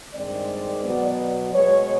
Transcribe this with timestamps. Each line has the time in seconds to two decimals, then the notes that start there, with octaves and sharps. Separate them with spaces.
0.14 G2 D#3 G#3 C4 D5
0.84 B2 F#3 B3
1.54 B2 G#3 B3 C#5